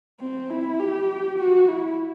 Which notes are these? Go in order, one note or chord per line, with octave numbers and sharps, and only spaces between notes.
C4
E4
G4
F#4
E4